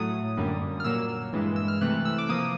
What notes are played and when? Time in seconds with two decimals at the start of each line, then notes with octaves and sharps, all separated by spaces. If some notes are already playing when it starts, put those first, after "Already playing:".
Already playing: A2 F#3 A3 D#6
0.37 F#2 D3 G3 A#3
0.80 F6
0.84 A#2 F#3 A#3 E6
1.33 G2 E3 G#3
1.56 E6
1.68 F6
1.81 C3 E3 A3 F#6
2.05 E6
2.18 D6
2.29 F3 A#3 D#6